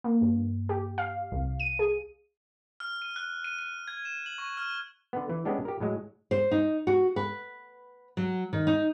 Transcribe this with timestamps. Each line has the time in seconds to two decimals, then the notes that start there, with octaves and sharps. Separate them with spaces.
0.04 A#3
0.21 G2
0.69 G4
0.98 F5
1.32 C2
1.60 D#7
1.79 G#4
2.80 F6
3.02 D#7
3.16 F#6
3.44 D#7
3.59 D#7
3.88 G#6
4.05 E7
4.26 F#7
4.38 C#6
4.57 F6
5.13 D3 B3
5.29 E3
5.45 G#3 B3 C#4 D4 G4
5.65 G4 A#4
5.80 A2 F#3 G#3
6.31 C5
6.51 D#4
6.87 F#4
7.16 B4
8.17 F#3
8.53 D#3
8.67 D#4